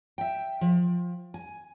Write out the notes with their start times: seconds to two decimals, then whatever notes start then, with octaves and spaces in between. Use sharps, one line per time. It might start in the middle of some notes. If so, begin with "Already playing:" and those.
0.18 E5 G5
0.61 F3
1.34 G#5